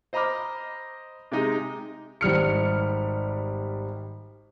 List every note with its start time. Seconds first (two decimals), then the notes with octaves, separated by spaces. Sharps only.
0.13 C5 D#5 A#5 B5 D6 F6
1.32 C3 G#3 D#4 D#5
2.21 G#1 G3 F6 C#7